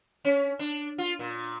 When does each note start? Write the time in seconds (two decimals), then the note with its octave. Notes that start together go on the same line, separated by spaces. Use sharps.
0.25 C#4
0.59 D4
0.98 F4
1.19 A#2